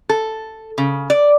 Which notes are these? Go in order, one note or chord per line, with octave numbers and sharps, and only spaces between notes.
A4
C#3
D5